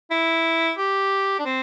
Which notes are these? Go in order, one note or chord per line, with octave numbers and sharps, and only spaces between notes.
E4
G4
D4
C4